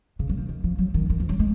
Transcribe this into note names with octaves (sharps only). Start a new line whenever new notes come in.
C#3
F#3
F3
D#3
F3
F#3
D#3
D#3
F3
F#3
G#3